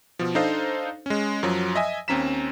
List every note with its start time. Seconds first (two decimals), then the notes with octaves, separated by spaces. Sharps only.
0.19 B2 F3
0.35 D4 D#4 A4 C5 D#5 F5
1.06 G#3 C#4
1.43 F#2 F3 F#3
1.75 D#5 E5 G#5
2.08 D#2 C4 C#4 A#5 B6 E7